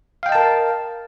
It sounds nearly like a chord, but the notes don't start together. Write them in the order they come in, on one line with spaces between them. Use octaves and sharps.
F5 G5 D#5 A5 A#4